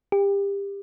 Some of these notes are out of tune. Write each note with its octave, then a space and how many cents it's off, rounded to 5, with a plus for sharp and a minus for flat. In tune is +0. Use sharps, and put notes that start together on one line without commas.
G4 +25